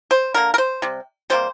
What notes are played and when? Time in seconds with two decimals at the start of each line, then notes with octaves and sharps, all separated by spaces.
0.11 C5
0.34 D3 A#3 A#4
0.54 A#4
0.58 C5
0.82 C3 G3
1.30 C3 G3 A#3 C5